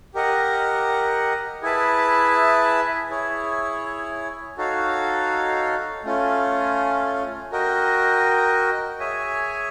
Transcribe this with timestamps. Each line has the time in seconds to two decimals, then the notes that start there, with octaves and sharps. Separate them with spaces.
0.15 G4 A#4 D#5 F#5
1.62 E4 G#4 B4 E5 A5
3.10 E4 G#4 C#5
4.57 D#4 F#4 A4 C#5 F5
6.04 A3 C#4 F4
7.52 F#4 A#4 D#5 G5
9.00 G#4 C#5 E5 G#5